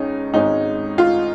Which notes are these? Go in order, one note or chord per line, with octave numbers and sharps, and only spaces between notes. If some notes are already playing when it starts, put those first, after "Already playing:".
Already playing: C#2 C#4 D#4
G#1 G#2 G#3 C#4 D#4
F4